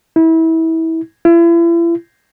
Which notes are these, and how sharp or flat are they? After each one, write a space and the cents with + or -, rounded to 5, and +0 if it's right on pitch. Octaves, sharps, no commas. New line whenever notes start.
E4 -25
E4 +40